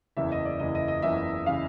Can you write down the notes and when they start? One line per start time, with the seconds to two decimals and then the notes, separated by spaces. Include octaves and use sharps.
0.17 F#1 E2 C#3 E3 E5
0.32 D#5
0.45 D5
0.59 F#1 E2 C#3 E3 D#5
0.75 D#5
0.88 D#5
1.02 F#1 E2 C#3 E3 E5
1.46 C#3 E3 F5